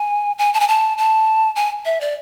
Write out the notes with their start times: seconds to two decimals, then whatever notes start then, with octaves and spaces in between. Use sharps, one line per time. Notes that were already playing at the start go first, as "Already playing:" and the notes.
Already playing: G#5
0.38 G#5
0.54 A5
0.60 G#5
0.68 A5
0.98 A5
1.56 G#5
1.85 E5
2.01 D5